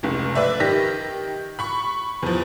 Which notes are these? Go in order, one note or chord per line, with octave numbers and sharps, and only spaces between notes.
F1 C#2
B4 D5 E5
D#3 G4 A#6 B6
B5 C#6
E2 F3